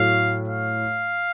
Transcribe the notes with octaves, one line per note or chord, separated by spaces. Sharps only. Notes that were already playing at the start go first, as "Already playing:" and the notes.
Already playing: A2 F#3 A3 F5
F5